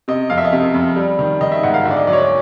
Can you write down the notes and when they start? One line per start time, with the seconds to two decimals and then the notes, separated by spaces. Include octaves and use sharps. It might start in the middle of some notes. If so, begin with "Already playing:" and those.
0.08 C3 D#5
0.30 F2 F5
0.38 E5
0.45 D#5
0.53 C3 E5
0.74 F2
0.96 G3
1.19 D#3
1.41 D#3 D#5
1.52 E5
1.63 G#2 F#5
1.74 F5
1.85 D2 E5
1.91 D5
1.97 D#5
2.07 F#3 D5
2.13 C#5
2.18 D5